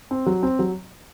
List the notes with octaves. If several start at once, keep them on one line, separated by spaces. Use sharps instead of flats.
C4
F#3
C4
F#3